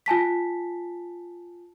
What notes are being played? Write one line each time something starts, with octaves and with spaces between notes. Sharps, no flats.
F4 G#5 A5 B6